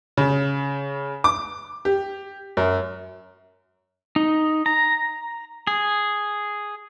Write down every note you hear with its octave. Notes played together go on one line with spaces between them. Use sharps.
C#3
D6
G4
F#2
D#4
A#5
G#4